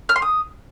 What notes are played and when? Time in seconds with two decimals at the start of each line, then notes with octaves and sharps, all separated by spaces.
0.09 F6
0.16 C6
0.22 D#6